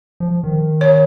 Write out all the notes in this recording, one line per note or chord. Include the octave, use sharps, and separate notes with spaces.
F3
D#3
C#5